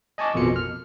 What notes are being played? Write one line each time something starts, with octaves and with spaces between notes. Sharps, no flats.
D#5 G#5 A5 C#6 D6
A1 F2 B2 A#3 F4 C#7
F6